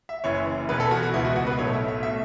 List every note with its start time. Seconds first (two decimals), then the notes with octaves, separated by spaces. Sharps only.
0.09 E5
0.24 F#1 F#2 E3 C#5
0.69 E1 E2 B2 B3 B4
0.80 A4
0.91 F#4
1.03 F#4
1.14 C#2 B2 B3 E4
1.25 F#4
1.36 F#4
1.47 B4
1.58 B1 A2 F#3 A3 C#5
1.73 E5
1.88 E5
2.03 B2 A3 E5